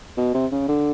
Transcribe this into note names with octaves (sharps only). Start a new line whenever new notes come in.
B2
C3
C#3
D3